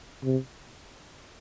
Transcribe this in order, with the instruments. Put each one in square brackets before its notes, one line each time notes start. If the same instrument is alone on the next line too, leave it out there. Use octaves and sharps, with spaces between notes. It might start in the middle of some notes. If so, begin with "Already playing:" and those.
[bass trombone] C3